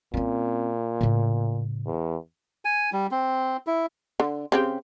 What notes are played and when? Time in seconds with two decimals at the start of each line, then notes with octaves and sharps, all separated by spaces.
0.14 A#2 C4 C#4
1.01 A2 C#3
1.86 E2
2.65 G#5
2.93 G3
3.11 C4
3.67 E4
4.20 D3
4.52 C#3 C4 G4